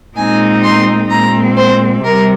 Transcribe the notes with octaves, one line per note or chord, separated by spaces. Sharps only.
A#2 G#3 C4 D#4 G#5
C6
A#2 G#3 C4 A#5
C5
C3 G3 A#4